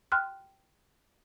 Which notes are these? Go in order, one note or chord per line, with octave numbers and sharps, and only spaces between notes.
G5 C6 F6 F#6